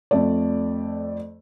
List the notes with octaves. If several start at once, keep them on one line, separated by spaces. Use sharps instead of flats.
F2 A3 D5